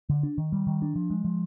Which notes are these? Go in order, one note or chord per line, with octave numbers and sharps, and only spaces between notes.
D3
D4
D#3
G3
D#3
D4
F3
G#3
F3